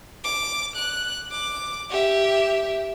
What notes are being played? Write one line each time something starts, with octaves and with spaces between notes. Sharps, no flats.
D6
F#6
D6
G4 E5